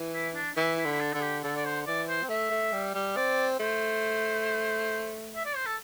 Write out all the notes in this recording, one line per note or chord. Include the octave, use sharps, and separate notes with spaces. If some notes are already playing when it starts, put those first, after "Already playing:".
Already playing: E3
E4
D4
E3 E4
E4
D3
E4
D4
D3 A4
G4
D3 A4
D5
C5
E3 D5
C5
C4
A3 E5
A3
G3
G3
C4 D5
A3 C5
E5
D5
C5
A4